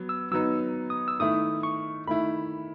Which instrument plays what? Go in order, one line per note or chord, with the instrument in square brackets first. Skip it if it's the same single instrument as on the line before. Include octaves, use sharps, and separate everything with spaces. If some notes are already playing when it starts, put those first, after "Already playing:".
Already playing: [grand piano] F#3 B3
[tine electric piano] E6
[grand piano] F#3 B3 D#4 [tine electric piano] E6
[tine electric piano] D#6
E6
[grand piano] D#3 A3 E4 [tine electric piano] D#6
[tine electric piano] C#6
[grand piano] D#3 A3 E4 [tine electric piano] B5